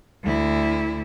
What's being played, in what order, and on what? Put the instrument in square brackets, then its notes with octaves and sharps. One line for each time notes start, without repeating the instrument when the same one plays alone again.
[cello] D2 E4